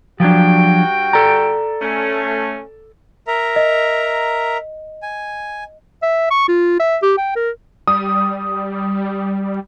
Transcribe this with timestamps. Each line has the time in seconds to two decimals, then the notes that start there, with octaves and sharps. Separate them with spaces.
0.20 G2 F3 F#3 D4 F#4 G5
1.13 A4 D5 A#5
1.81 A3 C#4
3.27 A#4 E5 A#5
3.56 D#5
5.02 G#5
6.02 E5
6.31 C#6
6.49 F4
6.80 E5
7.02 G4
7.18 G5
7.36 A#4
7.88 G3 D#6